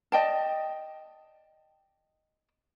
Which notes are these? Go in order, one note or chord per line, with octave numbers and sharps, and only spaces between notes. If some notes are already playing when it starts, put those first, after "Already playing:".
D5 D#5 G5 A5